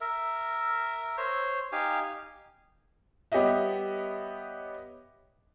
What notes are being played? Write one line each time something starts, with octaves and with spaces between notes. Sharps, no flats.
A#4 E5
C5 C#5
D#4 G4 F5 G#5
G3 B3 G4 C#5 D#5 E5